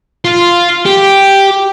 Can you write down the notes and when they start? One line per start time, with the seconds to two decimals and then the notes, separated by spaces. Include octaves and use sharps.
0.25 F4
0.86 G4